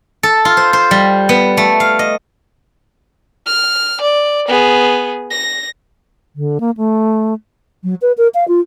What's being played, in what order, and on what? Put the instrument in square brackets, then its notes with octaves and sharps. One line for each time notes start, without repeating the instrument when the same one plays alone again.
[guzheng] A4
F4
C5
C5
G3
B3
A3
F5
D#5
[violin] F6
D5
B3 G#4
A#6
[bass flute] D3
A#3
A3
F#3
B4
A#4
F5
F4